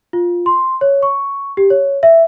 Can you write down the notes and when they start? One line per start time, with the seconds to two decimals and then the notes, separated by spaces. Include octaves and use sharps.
0.13 F4
0.46 C6
0.81 C#5
1.03 C#6
1.57 G4
1.70 C#5
2.03 E5